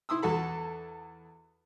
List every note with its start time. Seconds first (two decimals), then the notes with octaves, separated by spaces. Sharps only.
0.09 E4 C6 D#6 E6
0.22 E2 F#4 A4 B5